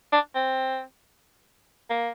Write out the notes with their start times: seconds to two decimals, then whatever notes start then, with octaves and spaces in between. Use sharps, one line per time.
0.12 D4
0.35 C4
1.90 A#3